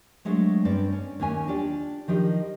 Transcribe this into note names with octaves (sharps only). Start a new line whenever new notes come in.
F#3 G#3 A3 D4 C5
G2 C4 C#4 D5
C#4
D#2 A#3 C#4 G#5
D4 F4 G4 D5
D#3 F3 G4 D#5